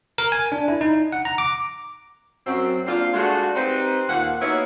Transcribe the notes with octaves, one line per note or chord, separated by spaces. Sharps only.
A#4
G#5
D4
E4
D#4
F#5
A#5
D6
F#2 F#3 C4
A#3 C4 D4 F4
G#3 A3 D4 F4 F#4
C4 D#4 G4 B4 C5
D#2 A#2 F4 F#5
A#3 B3 D#4 E4 F#4 C#5